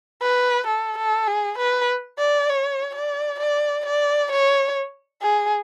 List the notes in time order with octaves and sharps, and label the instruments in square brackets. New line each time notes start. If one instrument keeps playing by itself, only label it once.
[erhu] B4
A4
A4
G#4
B4
D5
C#5
D5
D5
D5
C#5
G#4